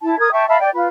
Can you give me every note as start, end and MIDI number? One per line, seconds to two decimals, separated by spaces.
0.03 0.18 64
0.03 0.18 81
0.19 0.31 70
0.19 0.31 87
0.19 0.31 92
0.32 0.47 76
0.32 0.47 79
0.32 0.47 81
0.32 0.47 85
0.48 0.57 76
0.48 0.57 77
0.48 0.57 81
0.48 0.57 83
0.60 0.69 74
0.60 0.69 79
0.74 0.88 65
0.74 0.88 71